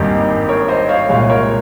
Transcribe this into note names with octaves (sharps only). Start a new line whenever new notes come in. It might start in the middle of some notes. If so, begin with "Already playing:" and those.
Already playing: G#1 G2 D#3 A#3 D#4 G4
A#4 C#5
C5 D#5
C#5 F5
C2 A#2 G#3 C#5 F5
A#4 C#5